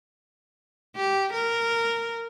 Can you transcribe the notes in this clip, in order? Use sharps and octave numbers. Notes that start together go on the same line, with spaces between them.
G4
A#4